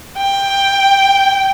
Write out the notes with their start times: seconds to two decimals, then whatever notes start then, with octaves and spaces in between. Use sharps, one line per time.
0.18 G5